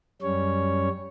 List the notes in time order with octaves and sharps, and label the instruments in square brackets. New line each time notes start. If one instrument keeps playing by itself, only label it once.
[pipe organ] F#2 G3 C#4 C#5